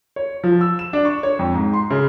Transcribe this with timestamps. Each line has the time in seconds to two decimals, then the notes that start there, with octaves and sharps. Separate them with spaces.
0.16 C#5
0.44 F3
0.61 E6
0.79 E7
0.93 D4
1.05 C#6
1.23 C#5
1.39 F2
1.54 G#2
1.73 C6
1.90 C#3